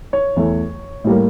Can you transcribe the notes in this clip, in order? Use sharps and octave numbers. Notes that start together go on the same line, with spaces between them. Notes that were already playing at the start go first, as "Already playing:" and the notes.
C#5
E2 E3 A3
A2 G3 A#3